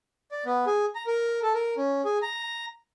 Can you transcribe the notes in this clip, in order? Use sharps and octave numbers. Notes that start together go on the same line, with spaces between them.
D5
B3
G#4
A#5
A#4
A4
A#4
C#4
G#4
A#5